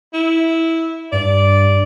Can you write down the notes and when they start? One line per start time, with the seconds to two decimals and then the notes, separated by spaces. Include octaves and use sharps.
0.13 E4
1.12 G2 D5